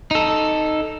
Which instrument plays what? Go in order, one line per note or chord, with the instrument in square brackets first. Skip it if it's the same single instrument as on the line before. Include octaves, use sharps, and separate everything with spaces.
[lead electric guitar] D#4 A4